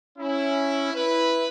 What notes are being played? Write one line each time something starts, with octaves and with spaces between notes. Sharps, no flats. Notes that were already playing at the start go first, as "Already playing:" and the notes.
C#4 E4
E4 B4